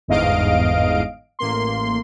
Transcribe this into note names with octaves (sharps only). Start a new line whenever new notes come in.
G1 E2 G#2 D#5 F5 D7
A1 A#3 C6